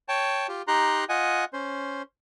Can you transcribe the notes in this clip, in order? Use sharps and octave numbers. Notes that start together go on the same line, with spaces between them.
C#5 G5 A5
F4 G4
D#4 G4 A#5 C6 F#6
F4 D#5 F#5 G#5
C#4 C5